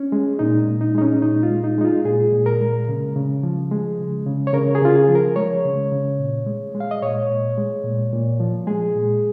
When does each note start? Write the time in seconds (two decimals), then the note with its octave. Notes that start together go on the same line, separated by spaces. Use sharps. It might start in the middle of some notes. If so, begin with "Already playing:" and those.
Already playing: C#4
0.12 G#3
0.39 A#2 D#4
0.68 A#2
0.81 D#4
0.94 G#3 D#4
1.01 C#4
1.22 A#2 D#4
1.43 F4
1.50 G#3
1.64 D#4
1.78 G#3 D#4
1.85 F4
2.05 A#2 G#4
2.32 A#2
2.46 A#4
2.61 G#3
2.88 C#3
3.16 C#3
3.43 F3
3.71 G#3
3.99 C#3
4.26 C#3
4.47 C#5
4.53 C#3 A#4
4.75 G#4
4.82 C#3 F4
4.95 G#4
5.09 F3
5.15 A#4
5.36 G#3 C#5
5.65 C#3
5.92 C#3
6.19 A#2
6.46 G#3
6.75 G#3
6.80 F5
6.91 D#5
7.02 A#2 C#5
7.30 A#2
7.58 G#3
7.84 A#2
8.13 A#2
8.40 F3
8.67 G#3 G#4
8.96 A#2